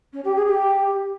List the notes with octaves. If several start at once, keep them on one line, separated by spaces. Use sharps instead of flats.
C#4
G4
G#4
G4